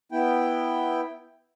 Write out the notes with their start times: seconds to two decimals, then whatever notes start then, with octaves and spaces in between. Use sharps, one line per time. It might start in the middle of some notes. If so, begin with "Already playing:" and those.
0.12 B3 E4 G5